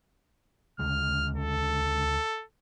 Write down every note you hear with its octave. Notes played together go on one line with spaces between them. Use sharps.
D2 C#3 G#3 F6
A4